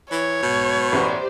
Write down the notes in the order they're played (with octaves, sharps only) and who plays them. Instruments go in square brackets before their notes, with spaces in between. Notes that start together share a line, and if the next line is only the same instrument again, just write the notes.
[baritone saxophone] E3 [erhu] C#5
[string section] B1 G#2 [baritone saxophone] B2
[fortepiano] A1 B3 C#6 [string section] G4 C5 D5